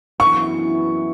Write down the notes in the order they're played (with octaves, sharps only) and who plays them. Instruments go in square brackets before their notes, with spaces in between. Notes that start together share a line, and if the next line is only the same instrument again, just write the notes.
[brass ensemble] F#2 E3 B3 E4 [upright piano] C#6